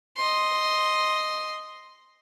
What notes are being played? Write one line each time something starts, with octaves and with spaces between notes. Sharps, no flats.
D#5 C6